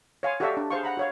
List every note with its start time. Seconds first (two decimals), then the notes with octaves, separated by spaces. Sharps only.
0.23 C#5 F5 G#5 C6
0.40 F#4 G4 A4 D5 E5 F5
0.57 D4
0.70 G#4 C5 F5 C#6
0.83 F#5 A#5 B5
0.97 F#4 C#5 F5